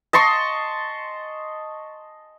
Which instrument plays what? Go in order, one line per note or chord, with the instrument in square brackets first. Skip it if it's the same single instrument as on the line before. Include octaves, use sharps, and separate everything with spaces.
[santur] D#5 A5 C6 C#6